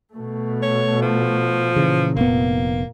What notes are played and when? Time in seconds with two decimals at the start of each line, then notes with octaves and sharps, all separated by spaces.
0.14 B2 A3
0.63 C#5
1.02 F3
1.76 A#2 C#3 E3
2.17 F1 A#3 B3